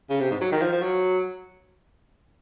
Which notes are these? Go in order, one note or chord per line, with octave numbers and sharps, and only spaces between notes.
C#3
C3
G#2
F#3
D#3
F3
F3
F#3